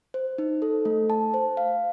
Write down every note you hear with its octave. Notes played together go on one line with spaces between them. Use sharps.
C5
D#4
A4
A3
A5
C5
F5